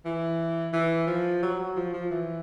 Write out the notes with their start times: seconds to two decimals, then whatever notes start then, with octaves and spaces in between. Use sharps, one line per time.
0.05 E3
0.73 E3
1.07 F3
1.42 F#3
1.59 F#3
1.76 F3
1.93 F3
2.11 E3